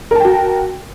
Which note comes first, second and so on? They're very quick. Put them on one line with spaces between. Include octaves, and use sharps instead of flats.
A#4 A5 G5 F#4